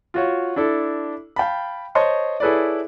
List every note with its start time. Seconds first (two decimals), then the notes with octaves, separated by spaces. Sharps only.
0.14 F4 F#4 C#5
0.56 D4 E4 A4
1.36 F5 G5 A5 B5
1.95 C5 C#5 D#5 A5 C6 C#6
2.40 E4 G#4 A4 B4 C#5 D5